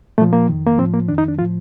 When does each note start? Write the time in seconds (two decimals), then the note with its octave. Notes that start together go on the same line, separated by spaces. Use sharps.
0.18 A#2 F3 A3
0.33 A#3
0.48 F2 D#3
0.67 A#3
0.78 A2 F3 C4
0.94 A#3
1.08 F2 D#3 D4
1.18 D#4
1.28 D4
1.38 A2 F3 F4